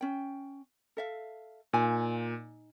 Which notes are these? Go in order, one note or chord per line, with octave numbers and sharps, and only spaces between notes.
C#4 G5
A4 E5 F5
A#2 D#4 G#5